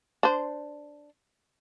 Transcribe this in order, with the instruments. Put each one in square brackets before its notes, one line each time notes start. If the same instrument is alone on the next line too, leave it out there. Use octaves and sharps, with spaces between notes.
[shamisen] D4 C5